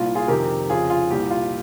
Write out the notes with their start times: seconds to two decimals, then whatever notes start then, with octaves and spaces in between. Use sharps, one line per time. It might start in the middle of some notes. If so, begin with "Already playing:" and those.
Already playing: C2 A#2 F4
0.15 F4 G#4
0.28 F2 C3 D#3 G4 A#4
0.70 F2 C#3 F4 G#4
0.90 F4
1.10 C2 A#2 G4
1.30 F4